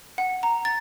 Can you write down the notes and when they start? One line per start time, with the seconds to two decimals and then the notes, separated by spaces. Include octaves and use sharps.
0.18 F#5
0.43 A#5
0.65 A6